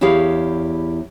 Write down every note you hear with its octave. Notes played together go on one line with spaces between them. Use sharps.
E2 E4 G4 G#4 C#5 F5